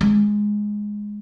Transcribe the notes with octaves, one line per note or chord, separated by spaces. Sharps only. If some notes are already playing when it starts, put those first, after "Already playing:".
G#3